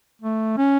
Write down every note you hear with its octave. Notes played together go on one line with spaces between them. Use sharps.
A3
C#4